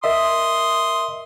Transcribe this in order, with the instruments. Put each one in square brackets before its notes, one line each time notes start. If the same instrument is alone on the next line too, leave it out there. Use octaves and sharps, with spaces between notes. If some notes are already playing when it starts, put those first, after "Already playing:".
[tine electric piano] A#4 D#5 E5 [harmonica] C6 D#6